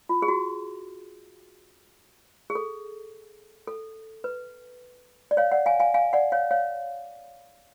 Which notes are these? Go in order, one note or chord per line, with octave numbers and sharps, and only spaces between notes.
F4
G#4
F#4
G#4
A4
A4
B4
D5
C#5 F5
D5 F#5
F5 G#5
F5 G#5
F5 G#5
D5 F#5
C#5 F5
C#5 F5